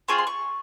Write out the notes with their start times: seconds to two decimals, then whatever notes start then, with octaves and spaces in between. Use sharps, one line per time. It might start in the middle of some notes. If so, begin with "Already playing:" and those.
0.08 C4 F4 G#4 C#6
0.18 C6
0.27 C#6